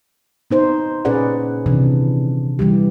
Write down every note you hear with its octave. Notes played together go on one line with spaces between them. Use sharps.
B3 D#4 C5
A#2 C#4 G#4 B4 D5 F#5
C3 D#3 E3 D4
E3 G3 G4